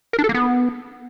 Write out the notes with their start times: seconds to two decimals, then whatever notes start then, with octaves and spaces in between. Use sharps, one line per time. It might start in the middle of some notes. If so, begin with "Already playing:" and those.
0.13 A#4
0.19 D4
0.24 A4
0.29 A#3
0.34 B3